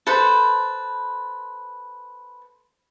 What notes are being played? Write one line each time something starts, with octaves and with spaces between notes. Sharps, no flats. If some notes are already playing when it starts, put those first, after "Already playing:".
A4 B4 C5